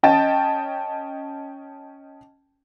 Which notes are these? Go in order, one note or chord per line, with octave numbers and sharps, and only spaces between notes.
C#4 D#5 G5 A5 A6